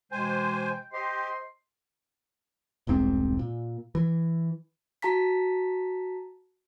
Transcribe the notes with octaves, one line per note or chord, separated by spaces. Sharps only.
B2 E3 G#3 C5 G5 G#5
G4 C5 D#5 C6
E1 C2 G#2 C4
A#2
E3
F#4 A5 A#5 B6